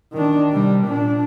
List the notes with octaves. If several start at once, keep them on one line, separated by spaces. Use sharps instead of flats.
D#3 D4
C3 G3
A#2 D4